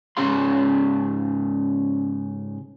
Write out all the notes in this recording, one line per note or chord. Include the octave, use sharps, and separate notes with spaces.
G#2 C#3 C#4 G#4 F5 C6